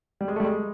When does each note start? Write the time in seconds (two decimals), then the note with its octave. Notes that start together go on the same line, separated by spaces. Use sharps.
0.21 G3
0.28 G#3
0.36 A3
0.40 G3
0.44 G#3